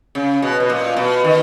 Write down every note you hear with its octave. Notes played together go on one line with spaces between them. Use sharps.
C#3
B2
B2
A#2
B2
D#3